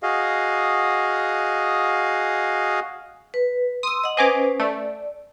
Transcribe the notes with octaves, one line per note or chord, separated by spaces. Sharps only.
F#4 G#4 D#5 F5
B4
C6 D#6 E6
D#5 F#5
C#4 B4 C5 D#5 G#5 D6
A3 D5